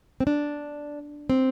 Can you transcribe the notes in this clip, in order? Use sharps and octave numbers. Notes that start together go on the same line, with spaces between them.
C4
D4
C4